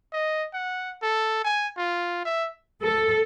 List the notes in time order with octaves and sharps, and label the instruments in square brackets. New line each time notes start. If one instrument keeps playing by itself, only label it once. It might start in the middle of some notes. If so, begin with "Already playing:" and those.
[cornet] D#5
F#5
A4
G#5
F4
E5
[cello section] A4